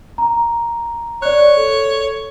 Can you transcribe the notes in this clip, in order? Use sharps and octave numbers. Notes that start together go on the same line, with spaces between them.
A#5
C#5 D5 F#6
A4